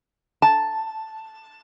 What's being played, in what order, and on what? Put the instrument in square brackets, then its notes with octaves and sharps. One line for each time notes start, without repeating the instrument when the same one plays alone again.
[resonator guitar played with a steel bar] A5